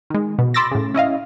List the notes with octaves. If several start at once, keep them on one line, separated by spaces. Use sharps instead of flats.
D#3 G#3
B2
B5 C6 D6 E6 A6 A#6
A2 C#3
C#4 E4 D#5 F5